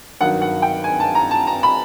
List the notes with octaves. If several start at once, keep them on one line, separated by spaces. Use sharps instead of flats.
G2 D#3 F#3 F#5
F#5
G5
G#5
A5
A#5
A5
A#5
B5